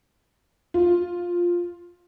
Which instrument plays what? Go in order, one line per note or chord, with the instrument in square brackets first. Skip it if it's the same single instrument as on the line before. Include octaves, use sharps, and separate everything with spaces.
[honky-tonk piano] F4